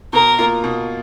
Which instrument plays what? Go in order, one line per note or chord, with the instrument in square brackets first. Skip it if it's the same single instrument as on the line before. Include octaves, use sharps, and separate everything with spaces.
[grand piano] B2 [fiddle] A#4
[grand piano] A#3 F4
B2